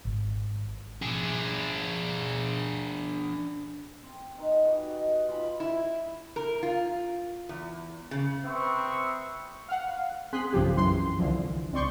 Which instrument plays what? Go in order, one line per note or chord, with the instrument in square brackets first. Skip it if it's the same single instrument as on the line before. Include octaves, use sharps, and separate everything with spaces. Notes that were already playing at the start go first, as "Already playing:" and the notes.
[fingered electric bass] G#1
[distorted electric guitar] D4 G#4
[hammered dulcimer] C4
D#4 B4
G#4
F#4 G4 B4
D#5
F4 G#5 B5
[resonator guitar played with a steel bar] E4
A#4
F4
E2
C#3
[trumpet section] C4 B4 E5 C#6 D#6
[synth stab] F5 F#5
C4 G#4 G#5 C6 F#6 B6
B1 G2 C#3 F3 G4
F#2 E3 C6
C2 D3 E3 F3
C#2 C4 D5 C6 C#6 G6